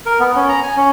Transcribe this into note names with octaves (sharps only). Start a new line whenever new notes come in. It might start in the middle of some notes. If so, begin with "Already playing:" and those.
A#4
B3
C#4
A#5
G#5
C#4